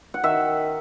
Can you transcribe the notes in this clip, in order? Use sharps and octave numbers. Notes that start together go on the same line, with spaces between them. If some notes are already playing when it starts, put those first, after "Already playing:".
F#5
D#3 E5